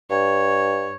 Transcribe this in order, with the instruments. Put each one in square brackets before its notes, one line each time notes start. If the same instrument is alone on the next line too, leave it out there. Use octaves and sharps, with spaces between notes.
[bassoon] G2 [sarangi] C#5